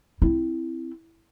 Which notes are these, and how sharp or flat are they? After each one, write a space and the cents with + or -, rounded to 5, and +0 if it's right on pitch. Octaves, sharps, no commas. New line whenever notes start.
C4 +0 E4 +0